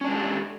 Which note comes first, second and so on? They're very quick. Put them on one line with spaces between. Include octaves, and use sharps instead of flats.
C#4 D4 G#3 G4 A4